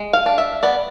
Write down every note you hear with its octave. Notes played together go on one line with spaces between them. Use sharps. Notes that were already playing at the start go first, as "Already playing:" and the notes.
Already playing: G#3
F5
D4
E5
B3 D5